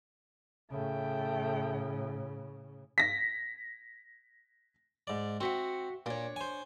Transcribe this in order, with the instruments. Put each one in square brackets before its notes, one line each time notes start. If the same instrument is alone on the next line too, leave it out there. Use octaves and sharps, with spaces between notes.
[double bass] A2 C#3 [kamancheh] A3 G5
[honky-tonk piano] A#6 B6
[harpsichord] G#2 D5
[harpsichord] C4 [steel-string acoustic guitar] F#4 E5 F#5
[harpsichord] A#2 [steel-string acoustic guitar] D4 C#5
[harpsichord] C5 G#5